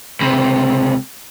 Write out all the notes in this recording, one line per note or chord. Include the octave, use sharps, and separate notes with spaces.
C#2 C3